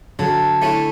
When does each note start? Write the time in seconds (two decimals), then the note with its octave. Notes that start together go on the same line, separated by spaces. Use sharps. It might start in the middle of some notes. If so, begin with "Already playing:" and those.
0.19 D3 F#3
0.62 A3 C#4 E4